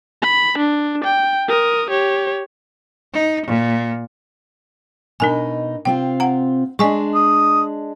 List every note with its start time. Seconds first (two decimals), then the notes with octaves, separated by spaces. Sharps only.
0.22 B5
0.58 D4
1.04 G5
1.48 A#4 D#6
1.90 G4 C#5
3.13 D#4
3.46 A#2
5.20 B2 D4 D#4 A#4 G#5
5.85 C3 C4 F4 G5
6.20 F#5 A#5
6.79 G#3 D4 D#5 G#5 C#6
7.15 D#6